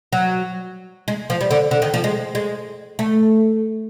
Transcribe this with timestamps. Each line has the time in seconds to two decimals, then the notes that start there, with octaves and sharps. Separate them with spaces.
0.13 F#3
1.08 G#3
1.30 F3
1.41 G3
1.51 D3
1.71 D3
1.82 D#3
1.94 F3
2.04 G#3
2.35 G#3
2.99 A3